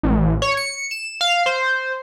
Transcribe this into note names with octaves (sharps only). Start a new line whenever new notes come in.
A1
C#5
C#7
E7
F5
C5